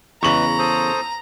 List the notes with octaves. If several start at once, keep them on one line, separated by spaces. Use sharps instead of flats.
E2 C#3 G#3 B4 A#5 B5 C#6 F#7
A4 C5 D#6